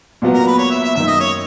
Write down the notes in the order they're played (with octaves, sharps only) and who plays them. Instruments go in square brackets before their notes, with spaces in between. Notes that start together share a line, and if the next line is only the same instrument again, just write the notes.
[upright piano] A#2 F#3 B3
[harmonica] A#4
B4
C#5
E5
E5
[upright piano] F#2 D#3 A#3 D#4 [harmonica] E5
[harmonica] D#5
C#5